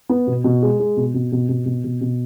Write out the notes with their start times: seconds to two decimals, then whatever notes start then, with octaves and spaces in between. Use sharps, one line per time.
0.09 B3
0.27 B2
0.44 B2
0.62 G#3
0.80 G#3
0.97 B2
1.14 B2
1.32 B2
1.49 B2
1.66 B2
1.84 B2
2.01 B2